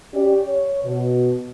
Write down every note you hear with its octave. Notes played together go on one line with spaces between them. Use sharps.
C#4 G4 D5
C#5
B2